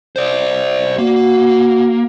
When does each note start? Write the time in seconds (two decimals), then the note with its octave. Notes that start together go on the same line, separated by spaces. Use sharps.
0.16 C5 D5
0.98 A#3 F#4